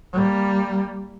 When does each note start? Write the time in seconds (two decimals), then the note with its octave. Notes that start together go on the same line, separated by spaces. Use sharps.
0.13 G3 A#3